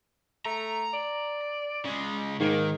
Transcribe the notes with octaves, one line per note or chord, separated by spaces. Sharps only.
A3 A#5
D5
C#3 G#3
G#2 D#3 A#3